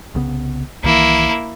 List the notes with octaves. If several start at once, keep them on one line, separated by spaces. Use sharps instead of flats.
C2 C#3 B3
C2 D#3 E3 A#3 E4